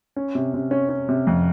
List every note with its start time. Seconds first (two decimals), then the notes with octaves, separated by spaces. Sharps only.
0.16 C#4
0.35 C3
0.54 C3
0.71 C#4
0.89 C#4
1.09 C3
1.27 F2